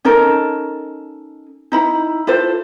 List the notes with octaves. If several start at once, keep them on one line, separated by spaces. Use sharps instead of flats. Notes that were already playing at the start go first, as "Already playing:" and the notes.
C#4 D#4 A4 A#4
D#4 E4 B5
E4 F4 A4 C5